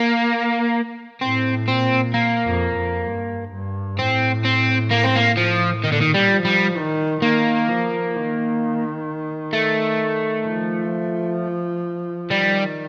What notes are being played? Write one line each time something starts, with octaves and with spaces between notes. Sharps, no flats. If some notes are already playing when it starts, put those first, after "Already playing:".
Already playing: A#3
A2 C4
A#2 C4
A#3
F2
F2
G2
G2
A2 C4
C4
A#3
C4
A#3
F3
A#2 D#3
D3
D#3
G3
F3
G3
D#3
D#3 A#3
F3
D#3
A3
F3
D#3 G3